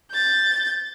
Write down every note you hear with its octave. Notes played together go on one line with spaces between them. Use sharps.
G6 A6